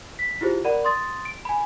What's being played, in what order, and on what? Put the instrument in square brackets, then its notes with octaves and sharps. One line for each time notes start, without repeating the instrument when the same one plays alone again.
[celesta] B6
E4 F4 G4 G#4 C5
A#4 D5 F#5 B5
C6 D#6 A6
D7
G#5 B5